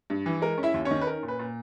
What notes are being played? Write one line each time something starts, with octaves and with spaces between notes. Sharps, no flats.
G2
E3
G#3 A#4
C#4
E4 E5
D#2
C#4 C#5
D#3
B4
C#4 A#4
A#2
B4
A#2